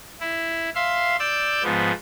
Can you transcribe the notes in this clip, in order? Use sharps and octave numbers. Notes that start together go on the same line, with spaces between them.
E4
E5 F5 C6
D5 E6 G6
G#2 F3 B3